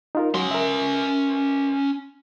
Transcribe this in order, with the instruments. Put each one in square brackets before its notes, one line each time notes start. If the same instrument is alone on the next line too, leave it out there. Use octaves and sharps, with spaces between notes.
[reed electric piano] D#4 F4 A#4
[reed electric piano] F#3 [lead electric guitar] C#4 C6
[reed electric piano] A#4 E5